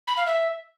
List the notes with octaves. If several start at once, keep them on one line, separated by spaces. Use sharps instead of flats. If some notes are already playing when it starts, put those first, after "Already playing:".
B5
F5
E5